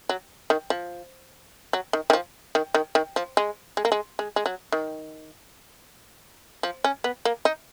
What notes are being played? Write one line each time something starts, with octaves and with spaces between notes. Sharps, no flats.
F#3
D#3
F3
F#3
D#3
D#3
F3
D#3
D#3
D#3
F3
G#3
G#3
A#3
G#3
G#3
G#3
F#3
D#3
F3
C#4
B3
A#3
D#4